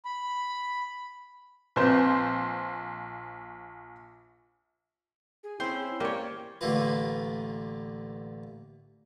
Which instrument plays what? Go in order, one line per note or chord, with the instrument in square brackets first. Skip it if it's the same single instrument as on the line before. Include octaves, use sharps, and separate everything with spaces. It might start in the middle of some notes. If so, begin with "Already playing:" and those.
[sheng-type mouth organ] B5
[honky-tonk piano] A#1 C5 [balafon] C4 B4
[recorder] G#4
[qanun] C4 C#4 [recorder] E4 [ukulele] C5
[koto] A#3 C#5 [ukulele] G4 [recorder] D5
[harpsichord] A1 D3 A3 A#3 F4 B4